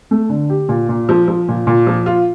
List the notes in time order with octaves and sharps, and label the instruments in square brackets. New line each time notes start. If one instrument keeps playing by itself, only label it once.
[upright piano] A3
D3
G4
A#2
A#2
F3
F3
A#2
A#2
F3
F4